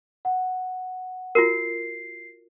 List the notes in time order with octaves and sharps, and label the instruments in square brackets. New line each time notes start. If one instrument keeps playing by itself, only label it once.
[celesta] F#5
[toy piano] F4 F#4 A#4 [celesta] C7